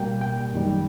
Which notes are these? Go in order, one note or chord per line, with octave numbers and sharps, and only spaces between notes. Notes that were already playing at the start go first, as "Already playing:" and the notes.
Already playing: B2 G3 A#3 G5
G5
F#2 D#3 G3